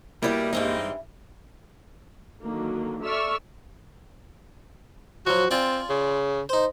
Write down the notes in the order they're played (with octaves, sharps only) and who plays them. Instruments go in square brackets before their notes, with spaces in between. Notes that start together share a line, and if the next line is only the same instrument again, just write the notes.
[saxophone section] B2 G3 [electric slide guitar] A#3 [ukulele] E4 [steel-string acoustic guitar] A#4 C#5 D5
[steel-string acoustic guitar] G2 E3 G3 [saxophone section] G#3 C4 D#4
[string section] D3 D#3 F#3 A#3
A4 D5 E5 C#6 E6 F6
[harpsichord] F3 F#3 [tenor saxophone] F#4
[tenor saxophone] C4 [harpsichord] F4 D5 G#5
[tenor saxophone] C#3
[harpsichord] D#4 C5